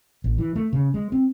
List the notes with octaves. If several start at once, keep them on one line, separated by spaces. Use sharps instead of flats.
A1
E3
A3
C#3
G#3
C4